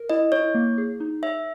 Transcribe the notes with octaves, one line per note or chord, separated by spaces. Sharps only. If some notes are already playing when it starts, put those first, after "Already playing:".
Already playing: A#4
E4 D#5
E4 C#5
A#3
G#4
D#4
C#5 E5